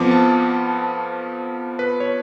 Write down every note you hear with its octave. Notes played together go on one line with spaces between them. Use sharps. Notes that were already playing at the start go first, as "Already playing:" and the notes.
Already playing: F2 F3 B3 D6
A5
B4
C#5